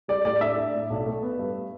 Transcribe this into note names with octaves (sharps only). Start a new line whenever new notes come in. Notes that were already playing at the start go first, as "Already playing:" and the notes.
G3 D5
A2 D5
D4 E5
D4
A2
B1
A3
B3
G2